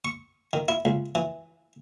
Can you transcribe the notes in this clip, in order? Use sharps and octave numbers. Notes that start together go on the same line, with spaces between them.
C#6
D#3
E4
C#2
E3